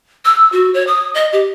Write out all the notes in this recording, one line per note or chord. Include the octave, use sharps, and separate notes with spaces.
E6
F#4
C#5
D#6
D#5
G4